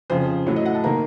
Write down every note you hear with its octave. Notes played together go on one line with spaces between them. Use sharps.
F2 C#3 F3 C5
A2 F#3 A3 C#5
D#5
F#5
A5
D#3 A#3 A#5